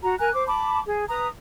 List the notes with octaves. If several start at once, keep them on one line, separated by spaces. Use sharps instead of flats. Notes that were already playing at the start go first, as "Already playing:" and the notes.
F#4 A#5
A#4 G#5 A#5 F#6
C5 D6
A5 B5 D6
G#4
B4 A#5 D#6